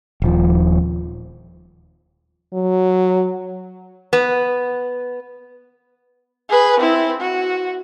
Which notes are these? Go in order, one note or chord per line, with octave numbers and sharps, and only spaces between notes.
D#1 F3
F#3
B3
G#4 B4
C4 E4
F#4